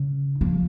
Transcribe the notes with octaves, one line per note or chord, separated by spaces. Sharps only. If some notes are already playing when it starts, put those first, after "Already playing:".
Already playing: C#3
F3